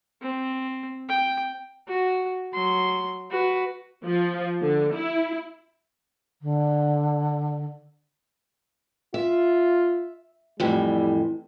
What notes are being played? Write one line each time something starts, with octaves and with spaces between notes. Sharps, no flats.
C4
G5
F#4
F#3 C6
F#4 B4
F3
D3
E4
D3
F4 E5
F2 A2 E3 G3